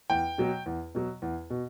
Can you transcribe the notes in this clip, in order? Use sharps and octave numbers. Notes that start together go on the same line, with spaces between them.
E2 G5
B2 F#3
E2
B2 F#3
E2
B2